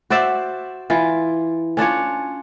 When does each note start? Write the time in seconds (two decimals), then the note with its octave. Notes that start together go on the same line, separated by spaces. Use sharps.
0.10 F#4 C5 D5 E5
0.90 E3 F4
1.77 C#4 D4 F4 C#5